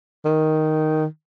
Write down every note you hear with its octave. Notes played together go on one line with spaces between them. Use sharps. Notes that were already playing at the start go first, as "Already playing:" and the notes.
D#3